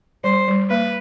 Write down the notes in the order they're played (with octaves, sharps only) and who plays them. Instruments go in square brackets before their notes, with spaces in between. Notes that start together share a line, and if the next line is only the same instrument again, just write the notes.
[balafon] G3 [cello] C5
[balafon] G3
[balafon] A#3 [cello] B4